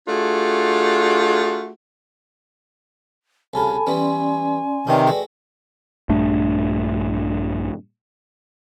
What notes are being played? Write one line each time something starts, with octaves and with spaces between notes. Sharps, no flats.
A3 D4 F4 F#4 G#4
C2 C#3 F4 A4 G#5 A5 B5
E3 G3 B3 C#4 D5 C6
C3 D#3 C#4 D4 B4 D5 G5
G#3 A3 F#4
A#1 G2 A3 D4